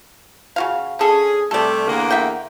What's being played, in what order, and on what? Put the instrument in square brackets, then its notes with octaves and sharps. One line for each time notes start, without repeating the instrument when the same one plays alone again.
[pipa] C#3 F#4 F5
[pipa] D3 A4 [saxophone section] C#4 G#4
[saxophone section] C3 G3 A3 [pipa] A4 D5
[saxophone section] E2 D3 A#3
[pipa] E5 F#5 G5